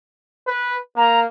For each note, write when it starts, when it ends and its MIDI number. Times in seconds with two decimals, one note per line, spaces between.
0.47 0.77 71
0.96 1.26 58
0.96 1.19 82